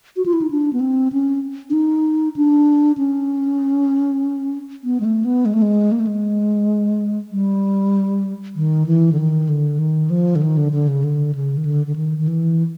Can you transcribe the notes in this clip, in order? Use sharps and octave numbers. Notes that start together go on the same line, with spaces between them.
F#4
F4
E4
D#4
D4
B3
C4
C#4
D4
D#4
D4
C#4
B3
G#3
A3
B3
G#3
A3
G#3
A#3
A3
G#3
G3
D#3
E3
D3
D#3
D3
D#3
F3
D3
D#3
D3
D3
C#3
D3
C#3
D#3
D3
D3
D#3
D#3
E3